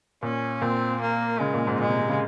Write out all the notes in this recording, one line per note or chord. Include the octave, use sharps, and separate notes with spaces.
A#2 C#4
A#2 C4
A#3
C#3 G#3
A#2
G#2
A#2 G#3
C3
C3
C#3